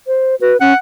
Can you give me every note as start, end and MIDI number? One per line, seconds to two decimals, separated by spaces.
0.07 0.35 72
0.41 0.54 66
0.41 0.57 71
0.61 0.73 61
0.61 0.76 78